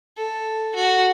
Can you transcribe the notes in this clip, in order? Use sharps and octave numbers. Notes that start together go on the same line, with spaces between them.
A4
F#4